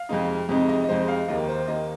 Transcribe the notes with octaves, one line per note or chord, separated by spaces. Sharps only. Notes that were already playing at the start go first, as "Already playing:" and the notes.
Already playing: F5
F2 C3 G#3 D#4
F2 C3 G#3 D#4
D#5
D#5
F2 C3 G#3 D#4 C5
F5
D#2 D#3 A#3 D#5
C5
D#2 D#3 A#3 D#5